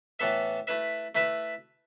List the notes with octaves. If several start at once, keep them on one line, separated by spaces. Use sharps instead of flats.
A2 E3 B3 A4 E5
A3 E4 B4 E5
A3 E4 B4 E5